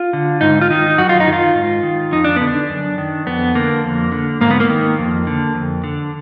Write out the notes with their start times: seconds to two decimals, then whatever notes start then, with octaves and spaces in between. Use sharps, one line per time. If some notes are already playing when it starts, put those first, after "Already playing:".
Already playing: F4
0.13 D3
0.41 G#2 D#4
0.61 F4
0.70 D#3 D#4
0.98 F#2 F#4
1.09 F4
1.20 D#4
1.27 D#3
1.33 F4
1.55 G#2
1.83 D#3
2.12 F2 D#4
2.24 D4
2.36 D3 B3
2.47 D4
2.69 F#2
2.98 D#3
3.26 F2 B3
3.55 D3 A#3
3.84 F2
4.12 D3
4.41 G#2 A#3
4.51 B3
4.60 A#3
4.69 D#3
4.98 F2
5.27 D3
5.55 F2
5.84 D3